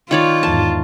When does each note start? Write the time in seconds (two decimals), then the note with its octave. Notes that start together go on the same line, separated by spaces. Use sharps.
0.11 D#3 F4 C#5 D5
0.43 E2 G#2 A5